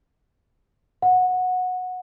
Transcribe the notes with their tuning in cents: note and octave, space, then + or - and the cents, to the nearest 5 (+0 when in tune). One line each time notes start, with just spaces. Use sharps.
F#5 -15